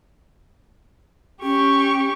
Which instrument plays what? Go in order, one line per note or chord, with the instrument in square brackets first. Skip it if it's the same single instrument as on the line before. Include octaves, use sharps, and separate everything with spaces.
[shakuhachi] C#4 [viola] G4 C#6